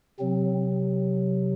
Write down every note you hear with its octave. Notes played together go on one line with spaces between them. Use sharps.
C3 F#3 C4